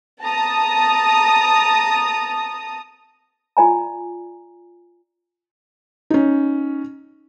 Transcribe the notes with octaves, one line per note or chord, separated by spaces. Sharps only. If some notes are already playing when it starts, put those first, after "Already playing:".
A5 A#5 D#6
F4 D5 G#5 A#5
C#4 D#4